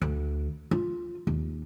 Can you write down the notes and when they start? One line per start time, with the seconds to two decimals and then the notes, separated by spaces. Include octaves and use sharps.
0.02 D2
0.71 F4
1.27 D#2